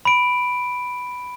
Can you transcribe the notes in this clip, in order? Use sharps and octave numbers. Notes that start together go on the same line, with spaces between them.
B5 D7